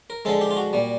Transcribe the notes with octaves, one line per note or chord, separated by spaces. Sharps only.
A#4
D3 F3 G#3 A4
G4
F4
F#4
A#2 G3